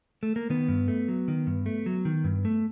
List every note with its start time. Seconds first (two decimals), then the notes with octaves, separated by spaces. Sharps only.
0.23 A3
0.36 A#3
0.50 D#3 B3
0.68 G2
0.88 A3
1.08 F#3
1.28 D#3
1.47 G2
1.66 A3
1.86 F#3
2.05 D#3
2.24 G2
2.45 A3